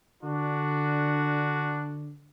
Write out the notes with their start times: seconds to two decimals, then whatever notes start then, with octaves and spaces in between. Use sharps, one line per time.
0.23 D3 D4 F#4